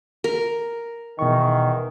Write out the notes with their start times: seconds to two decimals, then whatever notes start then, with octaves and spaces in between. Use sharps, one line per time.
0.24 A#4
1.19 E2 B2 D#3 C#6